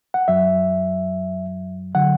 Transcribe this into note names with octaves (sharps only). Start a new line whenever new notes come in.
F#5
F#2 F#3 E5
D3 F#3 F#5